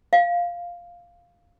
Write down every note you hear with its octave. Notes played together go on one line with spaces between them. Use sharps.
F5